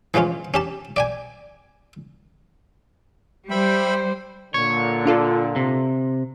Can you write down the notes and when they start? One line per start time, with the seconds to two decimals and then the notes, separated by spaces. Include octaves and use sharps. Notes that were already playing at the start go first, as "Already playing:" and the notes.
0.14 E3 F3 G#3 C#4 F4
0.54 C#4 G4 A5
0.96 D5 G5 G#5
3.50 G3 C5 E5 G5 B5
4.54 A#2 D3 C#5
5.06 D4 F4 A4
5.56 C3